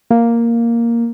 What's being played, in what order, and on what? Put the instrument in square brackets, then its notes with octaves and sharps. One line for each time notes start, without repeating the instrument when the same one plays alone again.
[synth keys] A#3